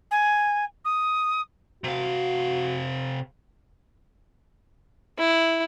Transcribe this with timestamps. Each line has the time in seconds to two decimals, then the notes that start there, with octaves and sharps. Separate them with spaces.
0.11 G#5
0.85 D#6
1.84 C3 F#4 F5
5.18 E4